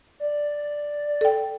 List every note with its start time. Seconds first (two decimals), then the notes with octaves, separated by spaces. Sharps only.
0.20 D5
1.21 A4 G5